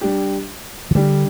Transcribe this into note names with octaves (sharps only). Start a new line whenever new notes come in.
G3 D4 G4
E3
D3 G3 D4 G4